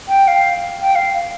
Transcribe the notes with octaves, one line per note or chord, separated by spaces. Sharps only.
G5
F5
G5
F5